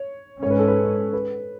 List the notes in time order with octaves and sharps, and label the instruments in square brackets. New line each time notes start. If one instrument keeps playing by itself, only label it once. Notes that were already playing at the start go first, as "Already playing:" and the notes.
Already playing: [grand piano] C#5
[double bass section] G#2 G#3 C#4 [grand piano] C#5
[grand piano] B4
A4
B4
B4